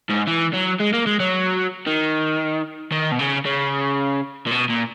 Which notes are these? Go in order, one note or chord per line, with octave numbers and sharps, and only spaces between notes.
G#2
E3
F#3
G#3
A#3
G#3
F#3
D#3
D#3
B2
C#3
C#3
A#2
B2
A#2